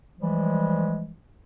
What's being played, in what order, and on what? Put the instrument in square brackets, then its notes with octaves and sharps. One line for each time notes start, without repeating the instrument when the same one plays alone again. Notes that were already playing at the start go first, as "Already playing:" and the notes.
[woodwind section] E3 F3 G3 G#3